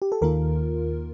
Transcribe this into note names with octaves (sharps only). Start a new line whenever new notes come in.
G4
A4
D#2 D#3 A#3 F4 A#4